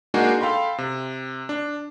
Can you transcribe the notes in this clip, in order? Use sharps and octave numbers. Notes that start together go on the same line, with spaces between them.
G#3 A#3 D4 D#4 F#4 G#4
A4 F5 G5 B5 C6
C3
D4